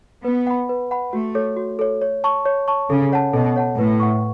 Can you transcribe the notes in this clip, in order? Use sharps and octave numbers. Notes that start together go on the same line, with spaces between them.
B3 B4
F#5 B5
B4
F#5 B5
A3 F#4
A4 C#5
F#4
A4 C#5
C#5
A5 C#6
C#5
A5 C#6
C#3 A4
C#5 F#5 A5
B2 A4
C#5 F#5 A5
A2 B4
F#5 C#6